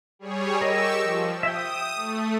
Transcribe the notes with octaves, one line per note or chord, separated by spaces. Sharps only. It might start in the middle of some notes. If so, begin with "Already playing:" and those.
G3 G#4 C#5
G4 A#4 D#5 C#6 E6
F3
E5 G5 D#6
A3